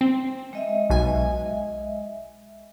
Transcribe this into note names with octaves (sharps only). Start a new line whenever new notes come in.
C4
G#3 D#5 E5
B1 B2 G#5